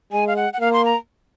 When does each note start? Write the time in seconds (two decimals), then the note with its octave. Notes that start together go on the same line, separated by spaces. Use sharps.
0.12 G#3 G#5
0.27 F5
0.36 F#5
0.53 F#5
0.60 A#3 F5
0.73 C6
0.85 A#5